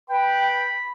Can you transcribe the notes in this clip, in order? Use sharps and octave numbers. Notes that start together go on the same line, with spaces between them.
B4 G5 B5